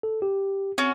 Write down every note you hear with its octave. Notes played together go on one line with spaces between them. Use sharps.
A4
G4
C4 C#4 F#4